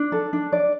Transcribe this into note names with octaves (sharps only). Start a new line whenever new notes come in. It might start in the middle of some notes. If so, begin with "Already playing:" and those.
Already playing: D4
A4
D4
D5